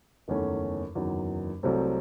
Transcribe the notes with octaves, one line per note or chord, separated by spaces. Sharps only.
F#1 E2 D#3 A3 C#4
F#1 E2 D#3 F#3
C2 C3 F#3 A3 C4